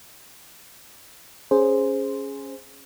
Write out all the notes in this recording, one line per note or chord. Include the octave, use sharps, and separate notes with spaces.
C#4 G#4 C5